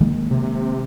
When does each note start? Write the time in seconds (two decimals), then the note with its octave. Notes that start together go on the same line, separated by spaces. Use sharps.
0.01 D#3 G#3 A#3
0.31 C3